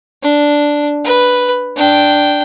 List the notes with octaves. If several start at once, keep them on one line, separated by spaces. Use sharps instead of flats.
D4
B4
D4 G5